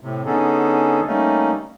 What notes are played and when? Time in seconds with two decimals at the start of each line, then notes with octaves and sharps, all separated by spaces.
0.01 A2 C3
0.26 D3 B3 C#4 D#4 G#4 A4
1.07 G3 A3 A#3 C#4 D#4